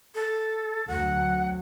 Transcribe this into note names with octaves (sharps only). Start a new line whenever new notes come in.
A4
D2 F#3 F#5